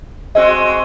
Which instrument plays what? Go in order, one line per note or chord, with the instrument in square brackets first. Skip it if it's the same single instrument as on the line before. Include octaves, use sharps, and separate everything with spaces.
[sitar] G#3 C4 F#4 [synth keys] D#5